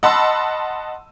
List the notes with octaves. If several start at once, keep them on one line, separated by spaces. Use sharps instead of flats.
D#5 F#5 A5 B5 C6 E6